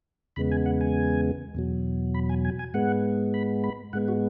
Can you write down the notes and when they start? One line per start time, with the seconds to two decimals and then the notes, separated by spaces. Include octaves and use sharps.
0.36 E2 C#3 G#3 B3 B5
0.52 G#5
0.66 F#5
0.81 G#5
1.55 E2 B2 F#3
2.14 B5
2.29 G#5
2.45 G#5
2.59 G#5
2.74 G#2 G#3 B3 F#5
3.34 B5
3.64 B5
3.93 G#2 G#3 B3 F#5
4.08 F#4